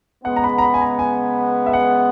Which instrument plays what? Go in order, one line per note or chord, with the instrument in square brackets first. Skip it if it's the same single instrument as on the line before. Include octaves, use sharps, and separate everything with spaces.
[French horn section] C#3 G#3 B3 [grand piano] F#5
[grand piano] A#5
B5
A#5
B5
G#5
A#5
G#5
E5
F#5